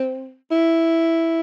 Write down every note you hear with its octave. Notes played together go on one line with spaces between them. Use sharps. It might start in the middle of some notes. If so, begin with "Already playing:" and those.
Already playing: C4
E4